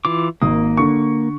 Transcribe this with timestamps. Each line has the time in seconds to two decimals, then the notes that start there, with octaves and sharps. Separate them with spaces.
0.05 E3 F4 D6
0.42 G#1 A#3 D#6
0.77 D3 C#6